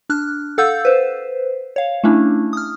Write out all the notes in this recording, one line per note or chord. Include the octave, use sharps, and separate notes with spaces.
D4 F6 F#6
A4 F5 F#5 E6 G6
B4 C5
C#5 F5
A3 C#4 D4 E4
D#6 F6